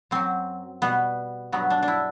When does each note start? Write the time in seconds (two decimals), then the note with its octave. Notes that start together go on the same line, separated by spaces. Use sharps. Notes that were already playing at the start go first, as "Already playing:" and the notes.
0.11 F#2 F#3 C4
0.82 B2 G3 B3
1.52 G2 F#3 B3
1.70 D4
1.83 D4
1.88 E4